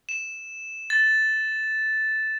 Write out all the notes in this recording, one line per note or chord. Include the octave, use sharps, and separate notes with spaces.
E7
A6